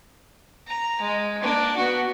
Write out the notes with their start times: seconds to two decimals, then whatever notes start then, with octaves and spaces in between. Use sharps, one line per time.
0.68 A#5
1.01 G#3
1.42 A#3 D4
1.76 B3 F#4